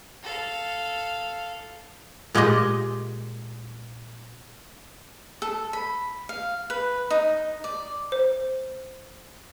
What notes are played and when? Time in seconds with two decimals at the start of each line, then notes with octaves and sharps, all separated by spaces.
0.23 A4 F5
2.35 A#2 G#3 F4 G4 D#5
5.42 A4
5.73 B5
6.29 F5
6.70 B4
7.10 D#4
7.64 D5
8.12 C5